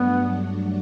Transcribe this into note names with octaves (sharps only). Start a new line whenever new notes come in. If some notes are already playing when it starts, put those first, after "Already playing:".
Already playing: G2 F#3 A3 B3 D4 F#4